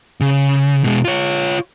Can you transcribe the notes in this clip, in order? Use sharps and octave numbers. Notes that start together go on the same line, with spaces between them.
C#3
B2 G#3
F4 C#5